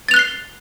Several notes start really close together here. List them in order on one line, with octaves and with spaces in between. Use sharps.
A6 F7 F#6 G7 C7